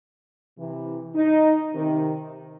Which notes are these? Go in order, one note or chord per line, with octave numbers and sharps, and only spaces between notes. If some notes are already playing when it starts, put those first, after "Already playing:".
C3 E3
D#4
C3 D#3